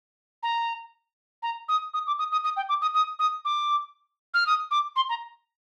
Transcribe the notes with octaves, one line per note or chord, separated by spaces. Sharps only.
A#5
A#5
D#6
D#6
D6
D#6
D#6
D#6
G5
D6
D#6
D#6
D#6
D6
F6
D#6
D6
C6
A#5